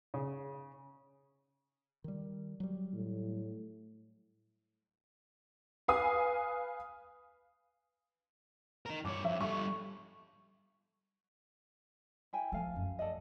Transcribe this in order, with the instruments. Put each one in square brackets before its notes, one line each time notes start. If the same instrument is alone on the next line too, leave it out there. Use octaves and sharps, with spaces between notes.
[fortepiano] C#3
[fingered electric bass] D#3 G3
F#3 G3
[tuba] A2
[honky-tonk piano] B4 F5 G#5 D#6
[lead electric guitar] D#4 A#4
[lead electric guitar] G2 C#5 [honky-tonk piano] D6
[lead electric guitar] F2 [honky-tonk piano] E5
[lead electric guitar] G3 A4 [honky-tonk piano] C#6
[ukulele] E4 G5 G#5
[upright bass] F3 A3 [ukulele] A4 F5 G#5
[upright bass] F#2
[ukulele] A4 D5 D#5